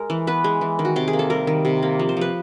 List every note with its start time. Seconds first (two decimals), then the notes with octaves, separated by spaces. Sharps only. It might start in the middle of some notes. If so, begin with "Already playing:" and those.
Already playing: G#3 A#4
0.10 E3
0.27 B3 B4
0.44 G#3
0.61 E3
0.79 D#3
0.85 F#4
0.96 C3 G4
1.08 G#4
1.13 A#3
1.19 A4
1.30 G3 A#4
1.47 D#3
1.65 C3
1.83 A#3
2.00 F3
2.09 C5
2.17 F3 B4